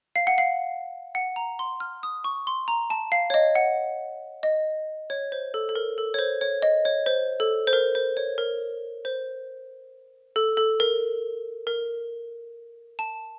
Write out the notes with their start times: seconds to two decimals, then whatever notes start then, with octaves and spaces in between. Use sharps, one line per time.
0.16 F5
0.27 F#5
0.38 F5
1.15 F#5
1.36 A#5
1.59 C6
1.80 F6
2.03 D#6
2.24 C#6
2.47 C6
2.68 A#5
2.90 A5
3.12 F5
3.30 C#5
3.34 D#5
3.55 F#5
4.43 D#5
5.10 C#5
5.32 C5
5.54 A4
5.69 A4
5.76 A#4
5.98 A4
6.14 C#5
6.19 C5
6.41 C#5
6.62 D#5
6.85 C#5
7.06 C5
7.40 A4
7.67 C5
7.73 A#4
7.95 C5
8.17 C#5
8.38 A#4
9.05 C5
10.36 A4
10.57 A4
10.80 A#4
11.67 A#4
12.99 A5